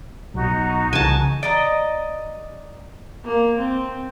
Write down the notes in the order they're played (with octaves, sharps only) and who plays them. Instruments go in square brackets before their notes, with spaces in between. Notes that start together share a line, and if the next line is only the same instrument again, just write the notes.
[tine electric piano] B1 [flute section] D#4 F#4 A#5
[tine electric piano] C2 C#3 E3 [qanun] G#5 A5
[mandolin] D5 D#5 A#5
[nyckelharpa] A#3
C4